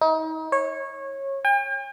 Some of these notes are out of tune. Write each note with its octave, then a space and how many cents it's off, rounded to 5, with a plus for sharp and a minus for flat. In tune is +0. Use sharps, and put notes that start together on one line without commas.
D#4 +35
C#5 -20
G5 +45